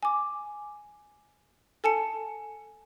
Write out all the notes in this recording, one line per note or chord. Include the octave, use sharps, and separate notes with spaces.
G#5 D6
A4 G#5 A5 C#7